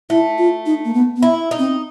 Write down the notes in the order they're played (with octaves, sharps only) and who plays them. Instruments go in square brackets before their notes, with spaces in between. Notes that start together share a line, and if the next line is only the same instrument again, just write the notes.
[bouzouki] A3 [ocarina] E4
[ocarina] F4
D#4
A#3
B3
B3
[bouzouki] E4
D#4
[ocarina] C4